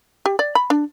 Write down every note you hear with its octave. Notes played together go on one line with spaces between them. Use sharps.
G4
D5
B5
D4